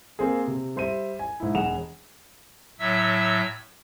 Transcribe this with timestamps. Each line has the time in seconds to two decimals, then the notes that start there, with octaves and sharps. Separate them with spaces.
0.19 A#3 C4 G#4
0.47 C3
0.76 G3 C5 E5 D#7
1.19 G#5
1.40 G#2 E4
1.55 E1 G#4 F#5 E7 F7
2.79 A2 F#3 E5 E6